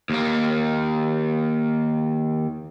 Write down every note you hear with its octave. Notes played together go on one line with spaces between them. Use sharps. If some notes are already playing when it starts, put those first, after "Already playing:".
D#2 A#3